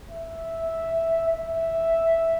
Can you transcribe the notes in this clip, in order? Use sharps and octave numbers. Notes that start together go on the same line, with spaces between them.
E5
E5